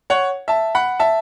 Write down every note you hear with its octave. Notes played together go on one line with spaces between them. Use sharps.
C#5 F#5
E5 A5
F#5 B5
E5 A5